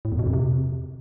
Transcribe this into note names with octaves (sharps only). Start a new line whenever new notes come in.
A2
E2
B2
F2
C3